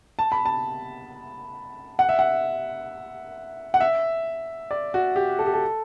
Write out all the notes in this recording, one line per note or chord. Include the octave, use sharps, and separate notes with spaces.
A5
B5
A5
F#5
E5
F#5
F#5
E5
D5
F#4
G4
A4
G4
A4